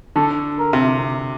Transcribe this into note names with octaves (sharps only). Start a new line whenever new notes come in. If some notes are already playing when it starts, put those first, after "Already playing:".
D3 A4
A#4
C3